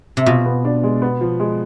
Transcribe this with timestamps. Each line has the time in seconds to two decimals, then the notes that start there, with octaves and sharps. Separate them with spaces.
0.17 C3
0.26 B2 F4
0.46 B3
0.65 D4
0.84 G#3
1.02 B3
1.21 F3
1.40 G#3